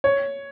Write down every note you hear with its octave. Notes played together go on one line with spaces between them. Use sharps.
C#5